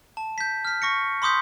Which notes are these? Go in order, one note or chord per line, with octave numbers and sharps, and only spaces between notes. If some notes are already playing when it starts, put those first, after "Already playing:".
A5
G6 B6
F6 B6
C#6 A#6 C#7
B5 C6 D6 D#6 G6 B6